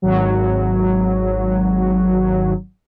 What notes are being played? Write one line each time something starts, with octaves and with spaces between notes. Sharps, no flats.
G#1 F#3